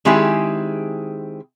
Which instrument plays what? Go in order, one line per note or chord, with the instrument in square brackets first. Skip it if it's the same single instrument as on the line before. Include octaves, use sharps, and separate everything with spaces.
[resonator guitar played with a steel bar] D#3 G#3 C4 E4 G4 G#4